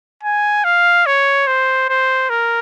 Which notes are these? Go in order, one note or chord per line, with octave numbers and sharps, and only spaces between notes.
G#5
F5
C#5
C5
C5
A#4